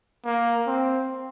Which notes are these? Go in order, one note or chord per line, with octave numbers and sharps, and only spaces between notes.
A#3
C4